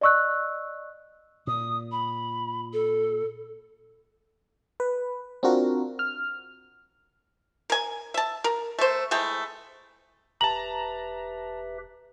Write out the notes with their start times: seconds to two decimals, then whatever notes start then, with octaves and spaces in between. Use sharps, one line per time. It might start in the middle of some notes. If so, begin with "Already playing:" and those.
0.01 D5 D#5 C#6 E6 F#6
1.47 A#2 D#6
1.92 B5
2.73 A4
4.80 B4
5.43 C4 D4 F4 F#4 A#4
5.99 F6
7.70 A#4 G#5
8.14 E5 A5
8.44 A#4
8.79 A3 C5
9.11 E3 G#3 A3 G5
10.41 E1 G4 B4 E5 A5 A#5 F#7